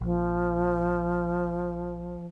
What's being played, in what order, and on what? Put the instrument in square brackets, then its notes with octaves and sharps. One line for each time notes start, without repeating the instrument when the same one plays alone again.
[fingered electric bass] A#1 [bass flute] F3